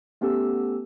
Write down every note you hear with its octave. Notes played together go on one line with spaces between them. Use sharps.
A3 B3 C#4 G4 A4 E6